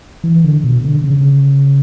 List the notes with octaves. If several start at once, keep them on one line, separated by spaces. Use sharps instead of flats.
E3
D3
B2
D3
C#3